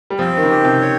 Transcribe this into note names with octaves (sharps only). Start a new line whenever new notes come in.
G3
F3 C4
D#3
C#3
G4
C3
C#5